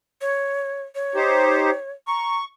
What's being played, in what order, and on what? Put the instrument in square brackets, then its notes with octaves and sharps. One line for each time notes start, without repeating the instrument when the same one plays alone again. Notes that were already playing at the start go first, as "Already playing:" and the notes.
[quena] C#5
C#5
[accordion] D#4 G4 C5
[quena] A#5 [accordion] C#6